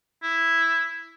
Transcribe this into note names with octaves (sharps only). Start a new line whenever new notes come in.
E4